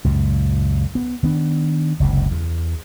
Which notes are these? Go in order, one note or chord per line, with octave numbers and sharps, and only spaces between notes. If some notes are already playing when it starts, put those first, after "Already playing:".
C#2 F#2 A#2
B3
D#3 B3 D4
F#1 C#2 C3
E2